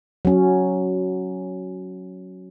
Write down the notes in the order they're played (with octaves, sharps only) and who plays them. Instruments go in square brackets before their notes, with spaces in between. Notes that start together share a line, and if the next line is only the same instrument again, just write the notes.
[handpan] F#3 C#4